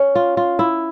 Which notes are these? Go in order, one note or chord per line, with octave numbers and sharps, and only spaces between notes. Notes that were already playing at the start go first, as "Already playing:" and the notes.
Already playing: C#4
F4
F4
E4